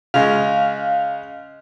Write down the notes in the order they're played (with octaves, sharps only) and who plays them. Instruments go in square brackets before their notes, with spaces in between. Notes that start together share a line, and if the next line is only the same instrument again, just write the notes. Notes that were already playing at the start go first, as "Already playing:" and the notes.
[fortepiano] C#3 G#3 [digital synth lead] F5